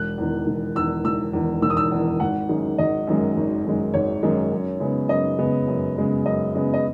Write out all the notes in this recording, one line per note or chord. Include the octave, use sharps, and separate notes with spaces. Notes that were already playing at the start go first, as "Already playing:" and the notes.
Already playing: E1 F#6
E2 D#3
E1
E2 D#3 E6
E1 E6
E2 D#3
E1 E6
D#6
E6
E2 D#3
G#1 F#5
F#2 D#3 G#3
G#1 D#5
F#2 D#3 G#3
G#1
F#2 D#3 G#3
G#1 C#5
F#2 D#3 G#3
F#2
C#3 G#3 B3
F#2 D#5
C#3 G#3 B3
F#2
C#3 G#3 B3
F#2 D#5
C#3 G#3 B3
D#5